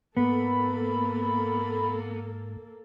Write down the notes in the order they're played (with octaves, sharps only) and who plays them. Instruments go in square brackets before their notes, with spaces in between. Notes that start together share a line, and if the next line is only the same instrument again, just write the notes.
[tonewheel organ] G#2 [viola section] A#3 A4 [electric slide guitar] B3 [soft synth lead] B5